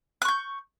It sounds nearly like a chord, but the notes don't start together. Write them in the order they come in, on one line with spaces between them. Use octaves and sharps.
F#6 C#6 G6